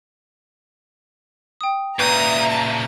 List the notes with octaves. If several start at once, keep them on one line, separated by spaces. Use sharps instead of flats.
G5 D#6
A#2 C#3 B4 E5 A#5 C#6 D#6 G6
A5